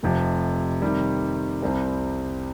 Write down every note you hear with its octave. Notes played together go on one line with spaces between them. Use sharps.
F1 F2 C3 F3
C3 D#3 G3
C2 C3 G3 C4